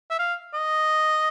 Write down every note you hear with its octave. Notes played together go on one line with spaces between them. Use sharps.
E5
F5
D#5